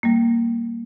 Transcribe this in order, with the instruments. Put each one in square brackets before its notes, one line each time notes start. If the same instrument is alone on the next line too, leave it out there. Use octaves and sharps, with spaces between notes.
[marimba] G3 A#3